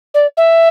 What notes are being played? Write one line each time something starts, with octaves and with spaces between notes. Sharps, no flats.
D5
E5